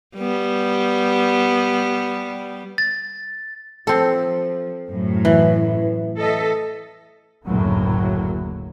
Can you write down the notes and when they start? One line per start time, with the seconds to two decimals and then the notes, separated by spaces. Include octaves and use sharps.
0.16 G3 B3
2.78 A6
3.87 F3 C4 A4
4.89 F#2 A2 F#3
5.25 E3
6.19 A4 D#5 E5
7.46 F#1 D2 A2 F#3 A#3